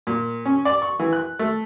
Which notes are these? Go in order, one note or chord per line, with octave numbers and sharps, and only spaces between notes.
A#2
C#4
D5
C#6
E3
F#6
A3